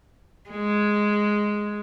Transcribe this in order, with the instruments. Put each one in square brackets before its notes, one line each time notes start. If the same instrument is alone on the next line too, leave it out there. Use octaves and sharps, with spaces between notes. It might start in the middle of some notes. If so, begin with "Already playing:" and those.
[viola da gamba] G#3